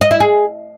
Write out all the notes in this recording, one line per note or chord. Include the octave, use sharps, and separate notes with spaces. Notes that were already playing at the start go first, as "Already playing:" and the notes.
D#5
E4
G#4